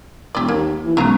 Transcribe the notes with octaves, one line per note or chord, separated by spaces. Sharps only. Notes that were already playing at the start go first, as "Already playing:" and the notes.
E1 G4 D5
D#2 A#3
E3
B1 D3 G#3 C#4 F5 A#5